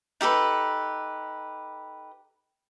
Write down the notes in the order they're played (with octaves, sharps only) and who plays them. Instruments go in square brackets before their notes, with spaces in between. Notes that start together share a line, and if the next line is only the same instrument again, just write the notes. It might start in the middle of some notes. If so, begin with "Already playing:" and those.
[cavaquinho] D#4 G4 A4 B4